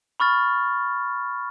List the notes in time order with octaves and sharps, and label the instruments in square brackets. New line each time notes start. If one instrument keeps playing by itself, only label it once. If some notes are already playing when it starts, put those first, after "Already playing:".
[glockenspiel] B5 C#6 F6 A6